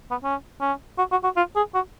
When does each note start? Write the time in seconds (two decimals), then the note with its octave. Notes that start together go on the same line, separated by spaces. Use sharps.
0.11 B3
0.24 C#4
0.61 C#4
0.98 F#4
1.12 F#4
1.24 F#4
1.37 F4
1.56 G#4
1.75 F#4